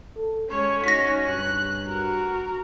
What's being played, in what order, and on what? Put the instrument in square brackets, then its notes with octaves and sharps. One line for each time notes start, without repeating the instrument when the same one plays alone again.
[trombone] A4
[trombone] G#3 [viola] C#4 [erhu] C#5
[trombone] D#4 [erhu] F#4 [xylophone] A#6 B6
[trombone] G2 [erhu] F#6
[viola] F#4 [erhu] A#4